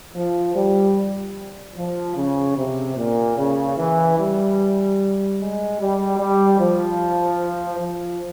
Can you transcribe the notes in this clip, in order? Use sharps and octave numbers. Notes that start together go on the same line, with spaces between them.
F3
G3
F3
C#3
C3
A#2
C#3
E3
G3
G#3
G3
G3
F3
F3